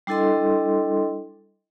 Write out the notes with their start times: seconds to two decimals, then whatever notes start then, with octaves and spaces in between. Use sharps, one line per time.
0.07 G3 D4 E4 A4 D#5 C6